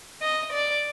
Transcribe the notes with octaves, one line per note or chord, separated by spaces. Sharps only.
D#5
D5